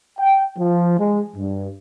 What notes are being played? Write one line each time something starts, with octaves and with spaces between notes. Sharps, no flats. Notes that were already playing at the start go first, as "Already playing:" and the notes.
G5
F3
G#3
G2